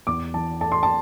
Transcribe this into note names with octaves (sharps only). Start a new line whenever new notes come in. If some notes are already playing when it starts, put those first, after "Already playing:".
E2 D6
E3 A5
A3 A5
C6
A5